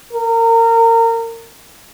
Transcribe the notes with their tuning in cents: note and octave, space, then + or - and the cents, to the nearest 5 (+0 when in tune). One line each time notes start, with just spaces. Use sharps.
A#4 -30